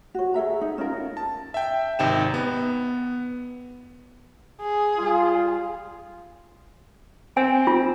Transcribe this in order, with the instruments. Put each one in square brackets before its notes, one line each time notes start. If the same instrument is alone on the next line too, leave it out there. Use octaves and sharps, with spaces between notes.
[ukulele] F#4 C#5
G#4 A4 E5 A#5
D#4
C#4 D#4 F4 A#4
[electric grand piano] A5
E5 G5
G#1 C3 D#4 G5 E7
B3
[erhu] G#4
[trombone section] G3 F4
[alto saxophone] C4 [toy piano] G#5
[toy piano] F4